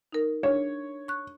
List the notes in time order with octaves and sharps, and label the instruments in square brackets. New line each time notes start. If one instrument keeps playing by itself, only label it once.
[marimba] D#4 A#4
[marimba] D4 [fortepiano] C#5
[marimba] C#6 F#6